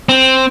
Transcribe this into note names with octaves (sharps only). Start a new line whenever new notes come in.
C4